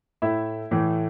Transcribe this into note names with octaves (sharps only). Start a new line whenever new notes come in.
A2 A3 E4 E5
A2 E3 A3